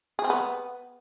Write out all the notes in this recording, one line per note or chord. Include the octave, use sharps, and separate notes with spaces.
G#4
C4
B3